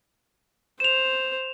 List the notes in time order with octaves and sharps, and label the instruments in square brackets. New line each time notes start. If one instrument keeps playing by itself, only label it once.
[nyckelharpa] C5 [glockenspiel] E7 F7